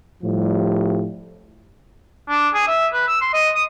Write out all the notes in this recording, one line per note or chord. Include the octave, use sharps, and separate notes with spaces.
A2 F3 G3
D4
G#4
E5
B4
E6
C6
D#5
D#6